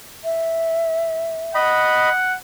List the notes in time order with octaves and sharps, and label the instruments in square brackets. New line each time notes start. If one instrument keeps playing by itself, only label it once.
[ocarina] E5
[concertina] D#5 B5 [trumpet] F#5